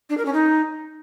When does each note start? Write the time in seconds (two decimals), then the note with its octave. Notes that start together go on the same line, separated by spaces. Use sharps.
0.09 D4
0.17 A#4
0.25 C#4
0.33 D#4